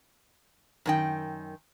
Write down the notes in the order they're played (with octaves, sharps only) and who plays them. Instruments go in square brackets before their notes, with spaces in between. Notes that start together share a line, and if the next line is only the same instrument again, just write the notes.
[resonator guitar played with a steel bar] F#2 D#3 G5